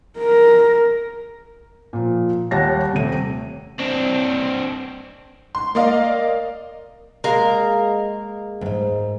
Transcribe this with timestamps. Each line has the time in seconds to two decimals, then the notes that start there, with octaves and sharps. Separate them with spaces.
0.18 A#4
1.93 A#2 F3
2.51 D#2 G3 C#5 F#5 A5 A#6
2.92 D#1 C3 A3 D#7
3.79 C4 D4
5.55 C6
5.75 A#3 A#4 D5 D#5 F5
7.24 G#3 A#3 A#4
8.61 D#2 G#2